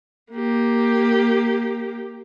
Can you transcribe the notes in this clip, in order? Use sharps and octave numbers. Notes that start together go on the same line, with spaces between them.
A#3 G4